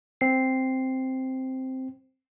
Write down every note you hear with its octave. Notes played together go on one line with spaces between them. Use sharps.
C4 C7